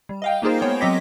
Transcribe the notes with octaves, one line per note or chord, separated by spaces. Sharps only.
G3
D#5 F5 G5
A#3 D#4 F4 G#4 A#4 C5
G#3 B3 C#5 G5
F#3 C4 D#5 D6 A#6 B6